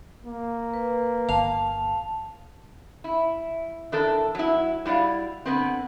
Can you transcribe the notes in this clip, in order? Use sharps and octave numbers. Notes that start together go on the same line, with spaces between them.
A#3
B4
G1 F5 A5
E4
E3 D4 A4 A#4
F#3 E4
G3 E4 F#4 D5 F5
D3 B3 C4